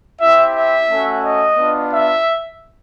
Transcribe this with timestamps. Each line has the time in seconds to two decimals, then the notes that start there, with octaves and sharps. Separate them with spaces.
0.21 C4 E4 G4 E5
0.55 E5
0.89 A3 C#4 F#4
1.24 D#5
1.58 B3 D4 F4
1.92 E5